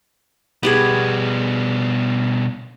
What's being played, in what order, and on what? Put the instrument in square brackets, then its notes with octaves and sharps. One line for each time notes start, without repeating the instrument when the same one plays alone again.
[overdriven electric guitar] B2 G3 [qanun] B3 G4 G#4